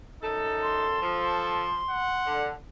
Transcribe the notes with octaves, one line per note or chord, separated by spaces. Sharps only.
F#2 D#4 A4
C6
F3 A4
F#5
D3